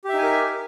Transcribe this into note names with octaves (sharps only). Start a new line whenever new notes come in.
D#4 G4 A#4 E5 G#5